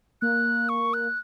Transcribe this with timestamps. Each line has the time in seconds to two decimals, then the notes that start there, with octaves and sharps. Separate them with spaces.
0.21 A#3 F#6
0.69 C#6
0.94 F#6